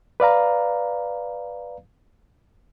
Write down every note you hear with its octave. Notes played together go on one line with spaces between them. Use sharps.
B4 D5 F5 A#5